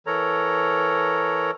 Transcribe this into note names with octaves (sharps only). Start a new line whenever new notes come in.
E3 A4 A#4 C#5 A#5